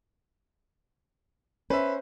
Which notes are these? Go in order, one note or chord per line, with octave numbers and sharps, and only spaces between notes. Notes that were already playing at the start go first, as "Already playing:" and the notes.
C#4 B4 C5 E5